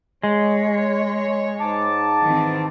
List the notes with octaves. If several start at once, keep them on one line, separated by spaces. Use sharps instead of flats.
G#3 C#5
G#2 A5 D6
D#3 E3 C4